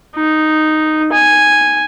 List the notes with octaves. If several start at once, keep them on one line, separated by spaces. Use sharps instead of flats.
D#4
G#5